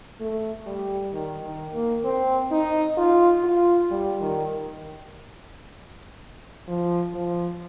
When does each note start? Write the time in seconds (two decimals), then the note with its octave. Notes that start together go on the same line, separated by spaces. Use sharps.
0.21 A3
0.66 G3
1.13 D#3
1.43 D#3
1.74 A#3
2.05 C4
2.52 D#4
2.98 F4
3.44 F4
3.91 G3
4.21 D#3
6.68 F3
7.14 F3